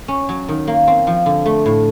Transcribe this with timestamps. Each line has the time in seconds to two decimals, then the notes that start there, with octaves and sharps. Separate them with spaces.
0.08 C#4
0.29 F#3
0.48 D#3
0.67 A#3
0.87 C4
1.07 F3
1.26 D3
1.46 A3
1.66 A2